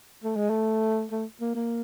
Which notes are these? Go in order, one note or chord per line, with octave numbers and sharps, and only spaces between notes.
A3
G#3
A3
A3
A#3
A#3